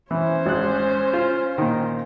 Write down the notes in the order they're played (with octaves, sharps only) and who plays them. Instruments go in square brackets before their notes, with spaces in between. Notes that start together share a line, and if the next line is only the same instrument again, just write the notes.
[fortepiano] E3 [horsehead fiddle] C#4 C5
[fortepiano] G#1 F#6
F4
A#2 D#3